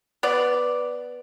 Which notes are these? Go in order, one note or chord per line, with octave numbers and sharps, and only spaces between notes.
B3 D5